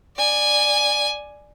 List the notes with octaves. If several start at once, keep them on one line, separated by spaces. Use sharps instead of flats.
D5 G#5